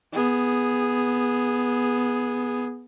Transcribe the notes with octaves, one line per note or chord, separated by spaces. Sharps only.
B3 G#4